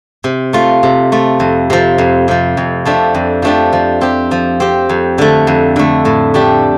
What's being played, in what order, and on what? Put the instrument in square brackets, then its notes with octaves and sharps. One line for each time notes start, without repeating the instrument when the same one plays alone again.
[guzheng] C3
A3 F4
C3
A3 F4
F2
C3 F3
F2
C3 F3
F2
F3 A3 D4 G4
F2
F3 A3 D4 G4
F3
C4 G4
F3
C4 G4
F2
D3 A3
F2
D3 A3
A2
A3 D4 G4